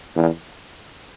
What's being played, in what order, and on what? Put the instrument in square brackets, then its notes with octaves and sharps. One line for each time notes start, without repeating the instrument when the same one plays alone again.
[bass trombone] E2